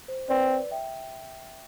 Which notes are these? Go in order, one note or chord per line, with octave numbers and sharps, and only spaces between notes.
C5
C4 B4 D5
E5 G5